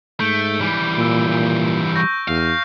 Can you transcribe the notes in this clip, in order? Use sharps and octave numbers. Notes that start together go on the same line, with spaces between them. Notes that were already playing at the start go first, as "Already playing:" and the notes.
G#2 A3 G6 D7 G7
E3 G3
A#2 E6 D7
A#2
C#6 G6 A#6
E2 F5